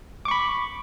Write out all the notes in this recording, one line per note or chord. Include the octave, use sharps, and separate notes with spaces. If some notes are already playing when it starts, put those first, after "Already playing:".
B5 C#6 D6